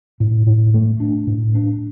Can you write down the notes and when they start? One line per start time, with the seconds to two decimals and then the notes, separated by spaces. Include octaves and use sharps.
0.20 A2
0.47 A2
0.74 A3
1.00 D4
1.27 A2
1.55 D4